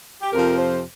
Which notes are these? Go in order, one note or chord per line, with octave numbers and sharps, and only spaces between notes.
G4
F2 C3 F3 A#4
C5